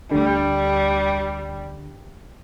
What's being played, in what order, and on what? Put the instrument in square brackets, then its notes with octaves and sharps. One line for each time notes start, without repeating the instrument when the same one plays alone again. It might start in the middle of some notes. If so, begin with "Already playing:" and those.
[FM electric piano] D2 D3 [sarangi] G3